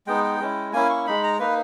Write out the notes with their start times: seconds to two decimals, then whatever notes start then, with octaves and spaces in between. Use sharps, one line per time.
0.07 G#3 B3 D#4 G5
0.24 G5
0.40 G#3 C#4 E4
0.73 A#3 C#4 E4 G#5
0.90 C#6
1.07 G#3 D#4 B5
1.23 A#5
1.39 A#3 D#4 B4